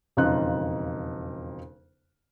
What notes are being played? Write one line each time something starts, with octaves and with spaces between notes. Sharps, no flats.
E1 F2 C#3 D#4 F4 F#6